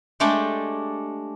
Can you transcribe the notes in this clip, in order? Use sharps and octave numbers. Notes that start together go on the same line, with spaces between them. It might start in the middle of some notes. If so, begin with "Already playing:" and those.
G#3 A3 D4 G4 G5